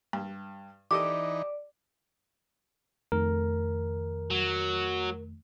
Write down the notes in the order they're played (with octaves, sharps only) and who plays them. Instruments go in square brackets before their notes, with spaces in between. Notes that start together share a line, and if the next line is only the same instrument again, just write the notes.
[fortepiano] G2
[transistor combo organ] E3 D#4 [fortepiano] G4 A4 D#5 [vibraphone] D5 [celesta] D6
[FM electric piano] F2 D#3 A3 [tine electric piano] A#4
[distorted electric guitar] F#3